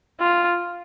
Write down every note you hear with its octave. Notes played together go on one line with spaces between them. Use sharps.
F4